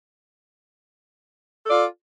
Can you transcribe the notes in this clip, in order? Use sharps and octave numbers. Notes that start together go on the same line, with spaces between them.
F4 A4 D5